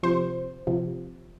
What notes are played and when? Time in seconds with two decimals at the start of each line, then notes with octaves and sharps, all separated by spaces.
0.03 C3 F3 C5
0.67 C3 F3